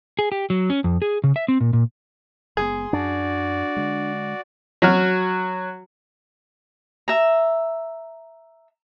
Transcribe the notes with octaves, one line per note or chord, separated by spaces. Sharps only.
G#4
G4
F#3
C#4
F2
G#4
C#3
E5
C4
A#2
A#2
F#1 G#3 B3 G#4 C6
F#2 D4 F#4 D5
D3 G#3
F#3 F#4 F6
E5 A#5